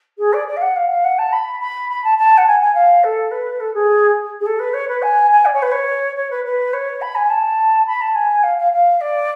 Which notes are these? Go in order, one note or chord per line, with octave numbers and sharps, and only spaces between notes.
G#4
D5
D5
F5
F#5
F5
F5
F#5
A5
B5
B5
B5
A5
A5
F#5
G#5
G#5
F5
A4
B4
A4
G#4
G#4
A4
B4
C#5
B4
G#5
G#5
D5
C#5
B4
C#5
C#5
B4
B4
C#5
B5
G#5
A5
B5
A5
G#5
F5
F5
F5
D5